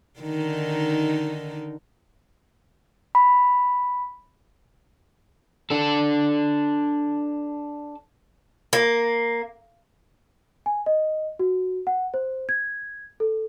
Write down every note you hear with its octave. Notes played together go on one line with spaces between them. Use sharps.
D3 D#3 D#4
B5
D4 A4
A#3
G#5
D#5
F#4
F#5
C5
G#6
A4